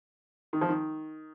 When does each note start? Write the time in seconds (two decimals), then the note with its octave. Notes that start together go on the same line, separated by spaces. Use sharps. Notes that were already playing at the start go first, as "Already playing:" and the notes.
0.53 D#3
0.61 F3
0.69 D#3